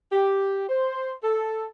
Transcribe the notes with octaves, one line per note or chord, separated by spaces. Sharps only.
G4
C5
A4